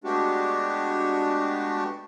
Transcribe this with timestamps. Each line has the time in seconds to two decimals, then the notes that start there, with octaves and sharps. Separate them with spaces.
0.04 G#3 A3 B3 D4 F#4 G4